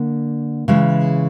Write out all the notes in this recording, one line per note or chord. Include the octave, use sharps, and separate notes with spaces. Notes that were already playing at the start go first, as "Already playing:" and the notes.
Already playing: D3 A#3
C#3 E3 G#3